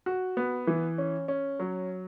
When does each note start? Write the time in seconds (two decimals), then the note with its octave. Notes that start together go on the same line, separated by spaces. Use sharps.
0.06 F#4
0.37 B3
0.67 E3
0.98 C#4
1.28 C#4
1.59 F#3